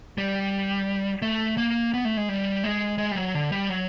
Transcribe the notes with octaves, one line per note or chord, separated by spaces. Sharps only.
G3
A3
A#3
B3
A3
G#3
G3
G#3
G#3
G3
F#3
D3
G3
F#3